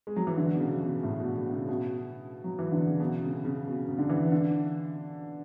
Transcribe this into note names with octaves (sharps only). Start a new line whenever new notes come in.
G#3
F#3
E3
D3
B2
C#3
B2
A2
B2
B2
C#3
B2
F#3
E3
D3
C#3
B2
C#3
C#3
B2
C#3
D3
E3
D3